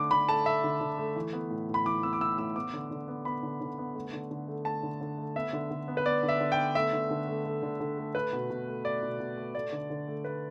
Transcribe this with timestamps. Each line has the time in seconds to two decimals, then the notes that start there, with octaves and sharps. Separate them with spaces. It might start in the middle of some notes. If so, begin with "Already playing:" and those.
Already playing: D3 A3 D6
0.11 D3 B5
0.29 A3 A5
0.46 A3 E5
0.64 D3
0.81 D3
0.98 A3
1.16 E3
1.33 B3
1.51 A2
1.69 A2
1.74 B5
1.85 E3 D6
2.03 B3 E6
2.13 D6
2.21 A2 E6
2.38 A2 E6
2.56 B3 D6
2.73 D3
2.91 D3
3.08 B3
3.25 B3 B5
3.43 D3
3.61 D3
3.78 B3
3.95 A3
4.13 D3
4.31 D3
4.48 A3
4.65 A3 A5
4.83 D3
5.01 D3
5.18 A3
5.36 B3 E5
5.53 D3
5.71 D3
5.88 B3
5.97 B4
6.05 B3 D5
6.23 D3
6.29 E5
6.40 D3
6.52 G5
6.58 B3
6.75 A3 E5
6.93 D3
7.11 D3
7.28 A3
7.45 A3
7.63 D3
7.80 D3
7.97 A3
8.15 A3 B4
8.33 B2
8.50 B2
8.68 A3
8.85 A3 D5
9.02 B2
9.20 B2
9.37 A3
9.54 A3 D5
9.72 D3
9.90 D3
10.08 A3
10.24 A3 B4